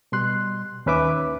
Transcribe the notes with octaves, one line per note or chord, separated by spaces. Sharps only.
B2 G3 C6 F#6
D#2 C#4 B4 E5 D6